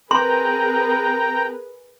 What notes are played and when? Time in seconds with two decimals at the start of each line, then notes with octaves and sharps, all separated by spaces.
0.11 C4 G#4 A#4 B4 G5 A#5 C6